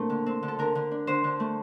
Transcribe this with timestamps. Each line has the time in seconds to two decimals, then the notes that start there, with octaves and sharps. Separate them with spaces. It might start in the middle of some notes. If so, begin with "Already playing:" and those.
Already playing: A#2 A3 C4 D4 A#4
0.10 D3
0.26 C4
0.43 D3
0.48 A4
0.59 D3 A#4
0.75 D3
0.91 D4
1.07 D3 C5
1.24 D3
1.40 A3